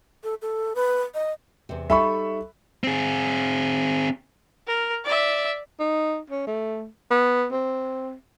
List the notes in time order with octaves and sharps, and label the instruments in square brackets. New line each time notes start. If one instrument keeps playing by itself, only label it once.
[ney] A4
A4
B4
D#5
[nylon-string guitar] E2 C3
[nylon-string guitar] G3 D#4 A4 [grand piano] E5 B5 C#6
[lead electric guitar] C4 G#4
[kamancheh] A#4
D5 E5
[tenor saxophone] D#4
C#4
A3
B3
C4